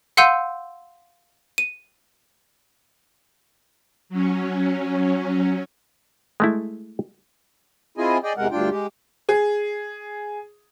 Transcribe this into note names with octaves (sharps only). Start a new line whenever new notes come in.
F5 F#5 C6 E6 G6 D#7
D#7
F#3 C#4
G#3 A3 E4
C4 E4 F4 G#4 D#5 G#5
G#4 D5 D#5 G5
E2 C3 G#3 A#4 F#5
D2 G2 D4 F4 G5
G#3 G4
G#4